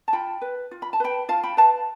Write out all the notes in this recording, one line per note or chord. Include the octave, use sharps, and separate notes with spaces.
A5
F4 G5 B5
B4
F4
B5
A5
B4 G5 B5
F4 F5 A5
G5 B5
B4 F5 A5